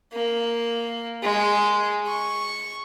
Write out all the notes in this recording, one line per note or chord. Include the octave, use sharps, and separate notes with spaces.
A#3
G#3
C#6